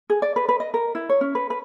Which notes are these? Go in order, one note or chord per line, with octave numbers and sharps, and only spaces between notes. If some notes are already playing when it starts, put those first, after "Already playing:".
G#4
D5
B4
B4
D#5
A#4
E4
C#5
C#4
B4
B4